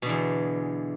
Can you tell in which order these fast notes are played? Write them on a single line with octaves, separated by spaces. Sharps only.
B2 D3 E2